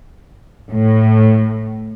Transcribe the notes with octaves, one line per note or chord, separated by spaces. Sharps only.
A2